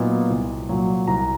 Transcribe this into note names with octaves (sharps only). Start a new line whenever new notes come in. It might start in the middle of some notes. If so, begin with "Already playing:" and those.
Already playing: A#2 F#3 B3 D#4
C2
A#2 F#3
C2 A#5